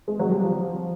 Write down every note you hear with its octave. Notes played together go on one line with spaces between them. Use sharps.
G#3
F#3
G3
F3